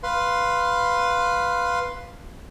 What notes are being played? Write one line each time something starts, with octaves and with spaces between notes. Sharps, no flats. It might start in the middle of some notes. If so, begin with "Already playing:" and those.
B4 F5 C6